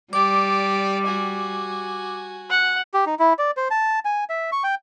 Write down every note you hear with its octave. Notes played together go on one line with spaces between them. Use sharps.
G3 G4 D5 D6
F#4 G#5
F#5
G4
D#4
E4
D5
C5
A5
G#5
E5
C#6
G5